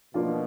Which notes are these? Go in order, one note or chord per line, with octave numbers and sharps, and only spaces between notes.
B2 F3 A#3 D4 F4